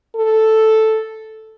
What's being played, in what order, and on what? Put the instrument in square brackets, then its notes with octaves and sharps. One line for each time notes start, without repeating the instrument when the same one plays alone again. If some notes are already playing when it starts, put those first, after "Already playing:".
[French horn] A4